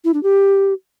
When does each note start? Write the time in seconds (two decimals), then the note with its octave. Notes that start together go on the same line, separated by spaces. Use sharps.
0.04 E4
0.14 D4
0.23 G4